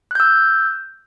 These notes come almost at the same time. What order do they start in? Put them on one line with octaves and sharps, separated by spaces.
F#6 G6 E6